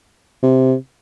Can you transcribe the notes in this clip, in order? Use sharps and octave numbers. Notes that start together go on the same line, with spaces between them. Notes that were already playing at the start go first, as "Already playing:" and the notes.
C3